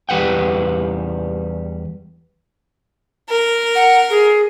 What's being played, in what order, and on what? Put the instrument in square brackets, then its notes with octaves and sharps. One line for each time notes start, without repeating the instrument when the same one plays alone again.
[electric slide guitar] E2 G3 B4 F#5 G5
[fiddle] A#4
[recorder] F#5
G#4